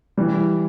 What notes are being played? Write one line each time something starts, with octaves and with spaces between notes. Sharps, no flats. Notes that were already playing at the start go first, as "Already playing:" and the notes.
E3 G3